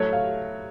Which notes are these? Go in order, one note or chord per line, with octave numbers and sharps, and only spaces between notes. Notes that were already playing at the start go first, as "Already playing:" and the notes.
Already playing: A2 F#3 A3 C#5
F5